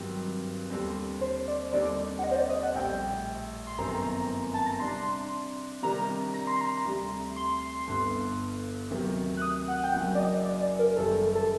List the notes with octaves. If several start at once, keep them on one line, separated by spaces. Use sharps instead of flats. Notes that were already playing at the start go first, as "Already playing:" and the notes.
Already playing: G2 D#3 F#3 C4 G4
D#2 D3 G3 C4
C5
D5
D#2 D3 G3 C4 D#4 D5
F#5
D#5
C5
D5
D#5
F#5
A#1 A2 G3 G5
C6
G1 F#2 D#3 A3 C4 A#5
A5
A#5
C3 G3 D4 C6
C3 D#3 G3 D4 A#5
A#5
C6
A#5
D2 C3 G3
C6
G1 G2 D3
D2 C3 D#3 F#3
F#6
D#6
F#5
G5
F#1 F#2 F#3 A#3 F#5
D5
D#5
D5
D5
A#4
F#1 F#2 D#3 G3 A4
A4